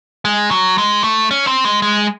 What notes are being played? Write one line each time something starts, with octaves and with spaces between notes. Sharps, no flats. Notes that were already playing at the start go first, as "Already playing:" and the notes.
G#3
F#3
G#3
A3
C#4
C4
G#3
G#3